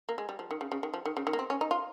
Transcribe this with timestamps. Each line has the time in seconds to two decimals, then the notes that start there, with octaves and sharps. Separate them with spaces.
0.09 A#3
0.18 G#3
0.29 G3
0.39 F3
0.51 D#3
0.61 C#3
0.72 C#3
0.83 D#3
0.94 F3
1.05 D#3
1.17 C#3
1.27 D#3
1.33 A#3
1.39 C4
1.50 C#4
1.61 D#4
1.71 F4